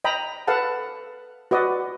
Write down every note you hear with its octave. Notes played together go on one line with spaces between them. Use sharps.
D#5 G5 A#5 B5
A4 B4 F5 F#5 A5
F#4 B4 D5 D#5